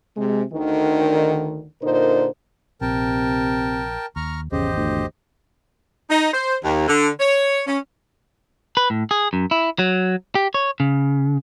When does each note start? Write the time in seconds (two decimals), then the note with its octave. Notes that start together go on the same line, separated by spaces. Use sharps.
0.17 C3 G#3
0.53 D2 D3 D#3
1.82 A#2 D3 D#4 A#4 C5
2.81 A#1 C3 A#4 G5 A5
4.16 D#2 A#5 C#6 F6
4.52 G#1 E2 C#3 G4 C5 D#5
4.77 D2
6.10 D#4
6.33 C5
6.64 D#2
6.88 D3
7.20 C#5
7.67 C#4
8.77 B4
8.90 A2
9.11 G#4
9.33 F#2
9.51 E4
9.79 F#3
10.35 G4
10.54 C#5
10.80 C#3